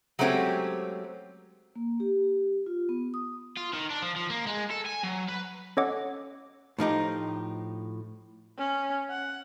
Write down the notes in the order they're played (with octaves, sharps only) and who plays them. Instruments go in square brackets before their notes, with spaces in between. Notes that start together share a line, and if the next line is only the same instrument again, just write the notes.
[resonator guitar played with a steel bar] F#3 G#3 A3 C4 C#4 G4
[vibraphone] A#3
G4
F4
B3
D#6
[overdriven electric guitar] F4
D#3
D4
F3
F3
A#3
G#3
A4
G#5
F#3
B4
[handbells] C#4 A4 C#5 D#5 F#5 D6
[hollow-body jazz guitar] A2 F3 D#4 G4
[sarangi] C#4
F#5